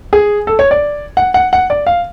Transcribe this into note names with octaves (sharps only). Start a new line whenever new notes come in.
G#4
A4
C#5
D5
F#5
F#5
F#5
D5
F5